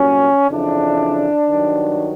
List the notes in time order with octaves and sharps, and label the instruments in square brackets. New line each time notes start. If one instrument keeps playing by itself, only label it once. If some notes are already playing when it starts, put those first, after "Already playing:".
Already playing: [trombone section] C2 A#2 F#3 C#4
F2 C#3 E3 D4
G2 D#3 F#3